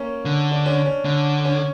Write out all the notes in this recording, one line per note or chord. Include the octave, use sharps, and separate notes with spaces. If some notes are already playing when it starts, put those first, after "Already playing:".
Already playing: A#3 C#4
D3
D4
C#4
C#4
D3
C#4